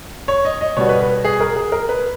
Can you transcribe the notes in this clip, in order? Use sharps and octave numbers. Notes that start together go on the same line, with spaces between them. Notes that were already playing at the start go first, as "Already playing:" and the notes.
C#5
D#5
D#5
B2 G3 B3 C#5
B4
B4
G#4
A#4
G#4
A#4
B4